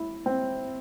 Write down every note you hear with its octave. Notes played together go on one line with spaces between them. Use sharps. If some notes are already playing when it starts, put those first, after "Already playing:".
Already playing: E4
C4